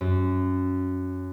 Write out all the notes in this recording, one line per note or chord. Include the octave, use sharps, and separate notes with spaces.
F#2